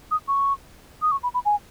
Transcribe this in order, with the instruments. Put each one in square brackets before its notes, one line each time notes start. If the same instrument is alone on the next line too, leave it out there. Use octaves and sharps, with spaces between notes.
[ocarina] D#6
C#6
D#6
C#6
B5
B5
G#5